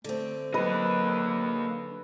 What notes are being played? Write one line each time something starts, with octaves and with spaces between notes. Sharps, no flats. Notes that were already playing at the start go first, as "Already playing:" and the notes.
D3 A3 C4
F#3 A#3 B4 D#5